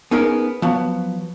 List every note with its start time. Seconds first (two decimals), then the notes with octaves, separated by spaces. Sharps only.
0.11 B3 C#4 D#4 G#4 A#4
0.62 F3 F#3 B3